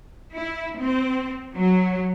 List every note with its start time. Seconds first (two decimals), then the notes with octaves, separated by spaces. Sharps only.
0.34 E4
0.78 C4
1.56 F#3